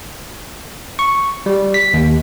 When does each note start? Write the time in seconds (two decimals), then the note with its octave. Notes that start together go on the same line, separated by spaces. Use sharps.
0.99 C#6
1.46 G3
1.74 B6
1.94 D#2